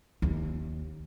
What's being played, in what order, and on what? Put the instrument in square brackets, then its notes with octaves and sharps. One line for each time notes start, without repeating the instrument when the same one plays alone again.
[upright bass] D#2